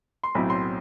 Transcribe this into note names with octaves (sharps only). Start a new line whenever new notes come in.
C6
B1 A2 F#3 C4 E4 B5
C6